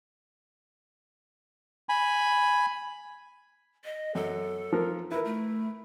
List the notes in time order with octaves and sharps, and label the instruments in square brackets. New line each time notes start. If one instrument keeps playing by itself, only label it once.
[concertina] G#5 B5
[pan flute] D#5
[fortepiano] F#2 [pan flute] A4
[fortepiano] F3 A#4
[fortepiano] E4 A#4 [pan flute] B4
[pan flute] A3